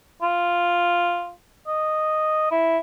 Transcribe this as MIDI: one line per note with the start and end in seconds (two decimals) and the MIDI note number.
0.22 1.32 65
1.67 2.47 75
2.51 2.78 64